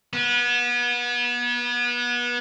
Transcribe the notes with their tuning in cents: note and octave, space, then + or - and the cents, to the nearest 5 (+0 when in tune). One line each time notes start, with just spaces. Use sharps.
B3 -30